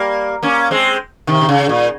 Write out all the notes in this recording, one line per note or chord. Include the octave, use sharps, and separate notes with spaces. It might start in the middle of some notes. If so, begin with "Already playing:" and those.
Already playing: G3 A#3
A#3 C#4
G#3 C4
C3 D#3
C3
C#3
A#2